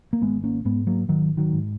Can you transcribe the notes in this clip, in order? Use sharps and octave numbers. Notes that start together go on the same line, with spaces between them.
A#3
G#1 G#3 B3
A#3 C#4
G#2 G#3 B3
F#3 A#3
G#1 D#3 F#3
D#3 F#3
G#2